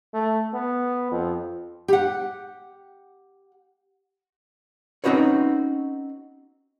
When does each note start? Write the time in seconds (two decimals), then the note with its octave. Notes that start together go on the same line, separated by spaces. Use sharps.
0.14 A3
0.53 B3
1.12 F2
1.88 G4 F#5
5.04 C4 C#4 D#4 F#4 B4 C#5